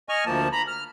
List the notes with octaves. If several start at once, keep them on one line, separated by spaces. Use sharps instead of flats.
D#5 G#5 C#6 F6
D2 F3 A#3 A5
A#5 B5
F6